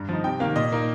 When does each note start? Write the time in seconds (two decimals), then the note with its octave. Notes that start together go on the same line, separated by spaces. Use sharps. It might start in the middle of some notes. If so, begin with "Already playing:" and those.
Already playing: G2 A#5
0.09 F3 D#4
0.24 C3 G5
0.40 D#3 A#3 F5
0.56 A#2 D#5
0.72 A#3 D#4